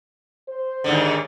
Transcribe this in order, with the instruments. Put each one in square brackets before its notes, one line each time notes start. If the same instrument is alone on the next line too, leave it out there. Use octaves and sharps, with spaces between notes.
[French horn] C5
[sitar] D#2 G#2 D3